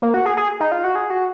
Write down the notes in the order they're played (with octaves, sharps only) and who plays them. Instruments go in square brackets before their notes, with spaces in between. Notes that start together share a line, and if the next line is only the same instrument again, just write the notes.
[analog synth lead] A#3
F#4
G#4
G#4
D#4
F4
F#4
G#4
F#4